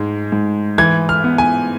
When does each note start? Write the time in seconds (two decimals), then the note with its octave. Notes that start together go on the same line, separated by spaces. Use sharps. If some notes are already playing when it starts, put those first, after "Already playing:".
Already playing: G#2 G#3
0.32 G#2
0.78 E3 G#6
1.09 F6
1.24 B3
1.38 G#5